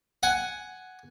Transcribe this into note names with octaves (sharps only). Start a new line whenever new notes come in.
F#5 G#5